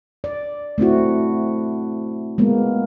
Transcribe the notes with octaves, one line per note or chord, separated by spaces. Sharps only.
D5
A3 C4 E4 F#4
G#3 A#3 B3